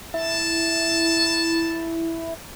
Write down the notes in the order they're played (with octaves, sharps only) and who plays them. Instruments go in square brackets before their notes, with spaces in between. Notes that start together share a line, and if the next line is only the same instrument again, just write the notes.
[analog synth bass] E4 [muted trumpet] A5